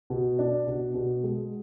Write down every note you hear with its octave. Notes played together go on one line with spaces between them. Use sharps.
B2
D4
B2
B2
G#3